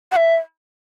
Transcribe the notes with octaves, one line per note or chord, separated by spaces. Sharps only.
F#5
E5